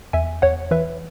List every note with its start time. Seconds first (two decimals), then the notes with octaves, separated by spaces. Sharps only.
0.13 E2 E5 G#5
0.42 E2 C#5 F#5
0.71 E3 B4 E5